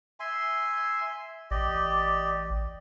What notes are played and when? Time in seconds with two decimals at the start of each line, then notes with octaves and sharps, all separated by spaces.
0.20 E5 G#5 C6
1.51 A1 G4 D5 D#5